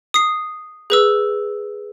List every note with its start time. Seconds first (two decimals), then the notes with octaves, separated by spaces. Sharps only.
0.14 D#6 C7
0.90 G#4 B4 E6